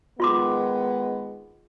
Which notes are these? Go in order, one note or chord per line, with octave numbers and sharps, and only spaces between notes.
D#3 G#3 B3 F4 C6 D6